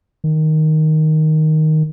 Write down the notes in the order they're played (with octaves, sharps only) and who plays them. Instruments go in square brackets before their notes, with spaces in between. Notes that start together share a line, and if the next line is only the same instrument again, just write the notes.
[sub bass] D#3